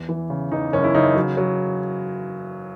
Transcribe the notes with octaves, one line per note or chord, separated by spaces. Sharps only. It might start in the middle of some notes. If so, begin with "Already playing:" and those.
Already playing: E2
E3
C#3
E2 D#4
F#1 C#4
E4
C#3 D#4
F#3
F#3